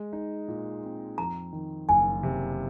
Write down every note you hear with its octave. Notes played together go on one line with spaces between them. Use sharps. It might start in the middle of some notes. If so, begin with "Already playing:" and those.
Already playing: G#3
D#4
A#2
C4
F2 A#5
D#3
F#1 G#5
C3